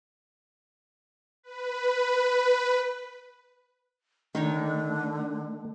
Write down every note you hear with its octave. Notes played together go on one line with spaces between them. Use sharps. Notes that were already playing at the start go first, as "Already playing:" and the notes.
B4
D3 D#3 A3 D#4 C#5